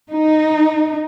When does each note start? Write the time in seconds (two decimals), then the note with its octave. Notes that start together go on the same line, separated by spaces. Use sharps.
0.10 D#4